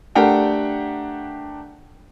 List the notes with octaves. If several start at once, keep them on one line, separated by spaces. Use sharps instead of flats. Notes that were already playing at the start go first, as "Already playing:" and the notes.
A3 D4 G4 A#4 F#5 G5